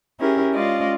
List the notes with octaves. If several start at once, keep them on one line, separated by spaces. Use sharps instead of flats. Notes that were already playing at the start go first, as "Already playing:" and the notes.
C#4 E4 G4 G#4 A#4
G#3 C#4 F4 D5 D#5 F5